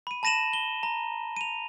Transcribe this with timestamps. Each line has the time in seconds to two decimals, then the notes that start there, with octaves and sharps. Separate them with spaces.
0.07 B5 D#7
0.23 A5 B5 A#6 D#7 E7 F#7
0.53 G7
0.83 A#5
1.36 D#7 F7